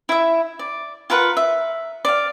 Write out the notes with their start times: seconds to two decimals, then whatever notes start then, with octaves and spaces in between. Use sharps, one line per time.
0.09 E4 E5
0.59 D5
1.10 F4 A#4 B4 F#5
1.37 E5
2.05 D5 F5